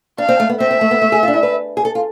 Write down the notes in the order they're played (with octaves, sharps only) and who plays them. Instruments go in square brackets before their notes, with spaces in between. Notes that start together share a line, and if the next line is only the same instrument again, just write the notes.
[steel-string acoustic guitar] D4 [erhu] F5
[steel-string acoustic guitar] C4
A3
B3
[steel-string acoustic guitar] C4 [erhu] E5
[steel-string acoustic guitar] C4
A3
B3
A3
G#4
F4
D4
E4
B4
G#4
A4
F4